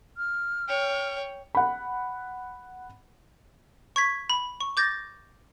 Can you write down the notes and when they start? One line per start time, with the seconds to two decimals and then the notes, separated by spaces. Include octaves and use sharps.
0.17 F6
0.68 C#5 G5
1.55 F#5 B5
3.96 C#6 G#6 B6
4.30 B5
4.61 C#6
4.77 D6 G6 A6 A#6